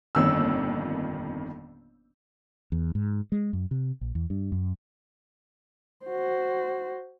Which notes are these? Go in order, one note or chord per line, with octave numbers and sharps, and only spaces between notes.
G1 F2 A#2 D#3 C#4 E6
E2
G#2
G#3
F#2
C3
A#1
E2
G2
F#2
F#4 C5